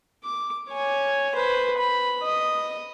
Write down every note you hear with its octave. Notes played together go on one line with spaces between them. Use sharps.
D6
C#5 G#5
B4 C5
B5
D#5